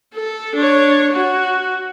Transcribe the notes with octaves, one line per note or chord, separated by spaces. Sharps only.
A4
D4 C#5
F#4